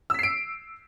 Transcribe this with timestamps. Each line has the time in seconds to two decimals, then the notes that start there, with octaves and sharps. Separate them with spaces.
0.10 E6
0.14 B6
0.19 C7
0.23 D7